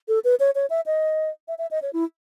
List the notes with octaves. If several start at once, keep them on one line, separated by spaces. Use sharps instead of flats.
A4
B4
C#5
C#5
E5
D#5
E5
E5
D#5
C#5
E4